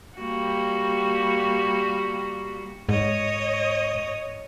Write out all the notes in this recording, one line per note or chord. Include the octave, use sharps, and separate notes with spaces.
G3 A#3 F#4
G#2 C#5 D#5 D#6